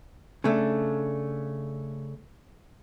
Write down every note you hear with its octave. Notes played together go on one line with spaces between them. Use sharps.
C#3 A3 D4